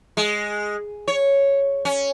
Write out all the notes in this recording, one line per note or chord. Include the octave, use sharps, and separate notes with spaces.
G#3
C#5
C#4